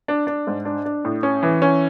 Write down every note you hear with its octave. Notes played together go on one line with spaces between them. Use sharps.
D4
D4
G#2
D4
D4
A2
C#4
E3
C#4